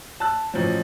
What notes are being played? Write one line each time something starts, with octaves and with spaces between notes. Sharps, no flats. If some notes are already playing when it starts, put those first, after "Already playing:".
A5 E6 F#6
A1 F3 F#3